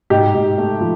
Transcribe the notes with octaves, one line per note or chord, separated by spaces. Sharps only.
G#2 G4
G#2
A3
F3